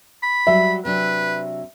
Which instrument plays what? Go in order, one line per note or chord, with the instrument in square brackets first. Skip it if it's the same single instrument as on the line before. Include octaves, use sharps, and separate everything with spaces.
[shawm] B5
[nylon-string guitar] F#3 G3 [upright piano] E5
[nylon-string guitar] C3 F#3 D4 [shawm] B4